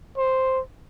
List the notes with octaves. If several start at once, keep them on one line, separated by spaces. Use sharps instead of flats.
C5